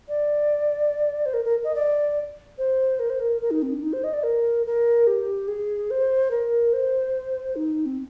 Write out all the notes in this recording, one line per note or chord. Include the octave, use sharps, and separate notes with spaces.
D5
C5
A#4
A#4
D#5
D5
C5
A#4
C5
A#4
A#4
D#4
C4
D4
D#4
C5
D#5
D5
A#4
A#4
G4
G#4
C5
A#4
C5
D#4
C4